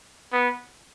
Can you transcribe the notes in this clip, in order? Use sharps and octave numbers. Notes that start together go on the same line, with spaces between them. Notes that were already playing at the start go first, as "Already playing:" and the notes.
B3